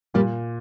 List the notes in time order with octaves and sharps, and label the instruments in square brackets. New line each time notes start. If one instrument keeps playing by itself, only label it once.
[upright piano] A#2 [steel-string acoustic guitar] G3 A#3